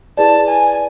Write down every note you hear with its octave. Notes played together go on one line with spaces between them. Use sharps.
E4 G#4 B4 D5 A5
G#5